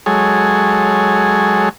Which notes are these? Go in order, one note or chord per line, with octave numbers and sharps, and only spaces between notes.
F#3 G#3 G#4 A4 C#5